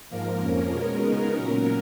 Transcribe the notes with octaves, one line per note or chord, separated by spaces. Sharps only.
G#2 F3 A#3 A#4
F2 F3 A#3 C#4 A#4
B2 G#3 C#4
C#3 G#3 B3 D#4
A#2 F#3 C#4